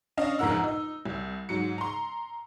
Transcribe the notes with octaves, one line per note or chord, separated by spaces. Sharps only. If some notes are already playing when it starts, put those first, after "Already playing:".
C#4 D4 D#5 F5
A#1 E2 G#2 A#4 F#5 E6
D#4
C2
G#2 F#3 C#7
A#5 C6